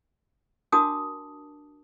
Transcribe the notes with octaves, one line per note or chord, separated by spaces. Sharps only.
D4 F#4 A#4 A5 D6 D#6